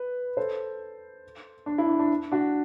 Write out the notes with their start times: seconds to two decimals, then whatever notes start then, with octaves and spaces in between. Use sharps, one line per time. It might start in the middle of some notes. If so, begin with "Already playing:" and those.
Already playing: B4
0.37 A4 C5
1.66 D4
1.78 E4
1.89 D4
1.99 D4
2.32 D4 F#4